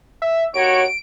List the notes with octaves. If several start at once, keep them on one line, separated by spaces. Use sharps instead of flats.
E5
D#2 F#4 C#5 D7